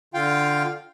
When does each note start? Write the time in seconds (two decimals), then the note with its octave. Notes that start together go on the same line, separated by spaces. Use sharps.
0.14 D3 F4 F5 G5